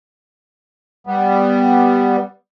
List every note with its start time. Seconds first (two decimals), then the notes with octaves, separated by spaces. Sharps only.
1.07 G3 B3